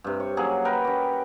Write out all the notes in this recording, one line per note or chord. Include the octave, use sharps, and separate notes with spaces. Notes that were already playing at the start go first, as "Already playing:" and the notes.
G2 C3
C#5
F#3 A#3 C#4 G#4
A#4 B4 G5
C#4 G4